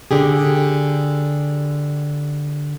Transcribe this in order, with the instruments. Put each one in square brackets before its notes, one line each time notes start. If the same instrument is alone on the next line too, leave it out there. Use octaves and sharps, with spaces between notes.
[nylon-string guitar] D3 G4 G#4